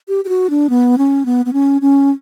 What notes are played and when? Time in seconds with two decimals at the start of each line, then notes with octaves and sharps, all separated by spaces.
0.08 G4
0.25 G4
0.29 F#4
0.50 D4
0.69 B3
0.98 C#4
1.25 B3
1.45 B3
1.53 C#4
1.81 C#4